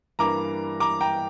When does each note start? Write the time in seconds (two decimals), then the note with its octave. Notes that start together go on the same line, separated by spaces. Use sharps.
0.19 G2 E3 G3 A#3 A#5 D6
0.80 A#5 D6
1.01 G5 A#5